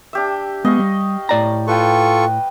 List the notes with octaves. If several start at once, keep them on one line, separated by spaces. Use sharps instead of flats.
D4 G4 E5
G#3 B3 D#5 F5 C#6
G3
A2 D5 A#5
F4 A4 B4 G5 C#6